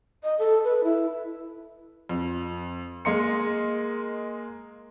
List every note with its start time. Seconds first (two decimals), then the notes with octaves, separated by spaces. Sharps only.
0.23 D#5
0.39 A4
0.64 B4
0.84 E4
2.09 F2
3.05 G#3 A#3 D#5 C6 C#7